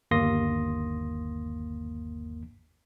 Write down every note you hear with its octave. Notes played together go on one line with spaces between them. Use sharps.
G1 D#2 A#3 C6 D#6 A#6